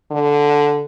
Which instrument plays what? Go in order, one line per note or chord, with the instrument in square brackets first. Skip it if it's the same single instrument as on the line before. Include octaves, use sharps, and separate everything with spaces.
[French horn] D3